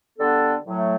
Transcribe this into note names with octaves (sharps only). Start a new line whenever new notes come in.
D3 G3 B3 D4 A4
A2 F#3 A3